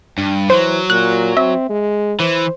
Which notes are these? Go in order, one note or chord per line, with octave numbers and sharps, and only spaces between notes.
G2
E3 F#3 C5
A#2 F#6
C4 E5
G#3
E3 C5